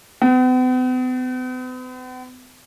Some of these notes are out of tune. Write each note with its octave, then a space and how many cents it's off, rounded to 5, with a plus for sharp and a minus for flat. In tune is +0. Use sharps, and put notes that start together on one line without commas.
B3 +45